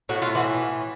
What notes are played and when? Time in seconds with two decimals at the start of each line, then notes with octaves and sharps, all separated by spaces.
0.09 A2 F#4
0.22 F4
0.35 E3 F#4